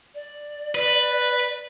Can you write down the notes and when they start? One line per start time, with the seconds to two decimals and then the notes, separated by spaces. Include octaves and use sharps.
0.14 D5
0.75 B4